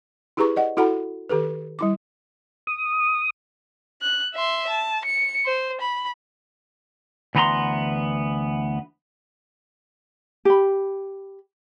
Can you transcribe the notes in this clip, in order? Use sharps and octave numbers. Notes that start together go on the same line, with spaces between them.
E4 G4 G#4 B4 A#5 C#6
D5 D#5 F#5
E4 F#4 A4 F#5 A#5 B5
D#3 G4 A4 B4
G3 E4 D6
D#6
F#6
E5 C6
A5
C#7
C5
B5
D2 E3 B3 D#5 A#5 C6
G4 B5